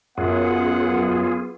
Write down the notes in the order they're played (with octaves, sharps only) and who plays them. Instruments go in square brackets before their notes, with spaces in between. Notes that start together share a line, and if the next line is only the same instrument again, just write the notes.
[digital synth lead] F#2 [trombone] B3 [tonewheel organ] F4 G#4 [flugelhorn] F#5